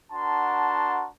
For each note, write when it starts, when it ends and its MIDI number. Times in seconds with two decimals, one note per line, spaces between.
0.13 1.08 62
0.13 1.08 66
0.13 1.08 70
0.13 1.08 78
0.13 1.08 81
0.13 1.08 84